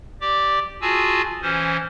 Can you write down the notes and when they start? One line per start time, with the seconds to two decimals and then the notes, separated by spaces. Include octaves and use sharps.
0.21 G4 D5 D6
0.81 F4 F#4 G#4 G#5 A5 E6
1.42 E3 C#4 C5